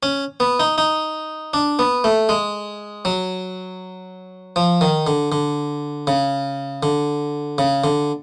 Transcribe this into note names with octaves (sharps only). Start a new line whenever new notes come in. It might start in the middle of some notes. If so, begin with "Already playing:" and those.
C#4
B3
D#4
D#4
D4
B3
A3
G#3
F#3
F3
D#3
D3
D3
C#3
D3
C#3
D3